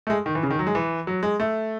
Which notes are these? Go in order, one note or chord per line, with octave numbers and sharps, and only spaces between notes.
A3
G#3
D#3
E3
C#3
D#3
F#3
G#3
E3
F#3
G#3
A3